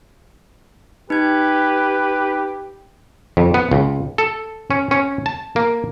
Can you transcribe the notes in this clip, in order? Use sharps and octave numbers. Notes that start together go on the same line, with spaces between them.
D#4 G4 B4 G#6
F2
B3
C#2
A4
C#4
C#4
A5
A#3